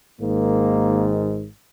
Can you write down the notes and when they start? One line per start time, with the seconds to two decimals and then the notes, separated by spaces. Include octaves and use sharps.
0.20 G#1 G#2 D#3 A#3